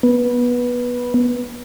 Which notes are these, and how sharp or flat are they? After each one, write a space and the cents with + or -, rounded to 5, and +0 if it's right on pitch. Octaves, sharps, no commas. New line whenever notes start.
B3 -15